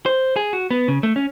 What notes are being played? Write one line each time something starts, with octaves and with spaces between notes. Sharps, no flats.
C5
G#4
F#4
B3
C#3
A3
C#4